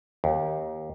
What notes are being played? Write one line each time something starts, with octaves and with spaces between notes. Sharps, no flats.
D#2